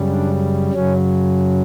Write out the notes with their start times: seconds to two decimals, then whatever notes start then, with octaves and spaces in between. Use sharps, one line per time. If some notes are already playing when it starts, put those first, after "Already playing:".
Already playing: F#2 C#3 G3
0.09 D4
0.73 F#2 C#3 F#3 C#4